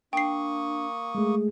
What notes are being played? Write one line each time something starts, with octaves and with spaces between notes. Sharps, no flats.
A#3 D4 G5 C#6 D#6 C7
G#3 A3 G#4